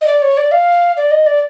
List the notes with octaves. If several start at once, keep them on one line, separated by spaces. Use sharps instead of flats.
D#5
D5
C#5
D5
F5
D5
D#5
D5